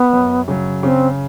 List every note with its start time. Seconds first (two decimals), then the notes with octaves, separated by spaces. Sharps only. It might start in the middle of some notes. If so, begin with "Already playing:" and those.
Already playing: B3
0.13 F#2
0.48 C#3 F#3
0.83 C#3 C4